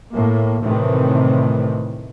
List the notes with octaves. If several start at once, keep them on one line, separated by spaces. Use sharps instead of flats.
A2 A#3
A2 C3 D#3 E3